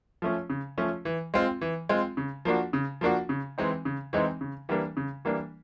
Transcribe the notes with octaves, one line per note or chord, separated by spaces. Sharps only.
F3 A3 C#4
C#3
F3 A3 C#4
E3
G#3 C4 F4
E3
G#3 C4 F4
C#3
F3 A#3 D4 F#4
C#3
F3 A#3 D4 F#4
C#3
E3 G#3 C4 D#4
C#3
E3 G#3 C4 D#4
C#3
E3 G3 A#3 D4
C#3
E3 G3 A#3 D4